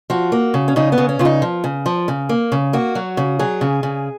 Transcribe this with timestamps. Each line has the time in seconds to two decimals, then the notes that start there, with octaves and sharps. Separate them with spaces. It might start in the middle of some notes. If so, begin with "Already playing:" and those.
0.10 F3 F#4
0.32 A#3
0.54 C#3
0.68 C#4
0.76 C#3 D#4
0.92 B3
0.98 C#3
1.09 C#4
1.19 C#3 F4
1.25 D#4
1.42 F3
1.64 C#3
1.86 F3
2.08 C#3
2.29 A#3
2.52 C#3
2.73 A#3 F#4
2.95 F#3
3.17 C#3
3.39 F#3 G#4
3.61 C#3
3.83 C#3